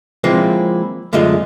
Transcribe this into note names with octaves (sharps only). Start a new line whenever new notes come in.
F3 G#3 A#3 C4 E4 F4
F#2 D3 G#3 A3 F4 D#5